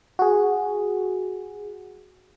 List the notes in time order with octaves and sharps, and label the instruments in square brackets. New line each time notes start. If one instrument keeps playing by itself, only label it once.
[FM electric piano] F#4 G#4